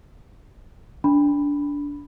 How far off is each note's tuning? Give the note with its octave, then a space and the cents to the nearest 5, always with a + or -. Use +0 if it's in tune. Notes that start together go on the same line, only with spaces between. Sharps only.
D4 -20 B5 +0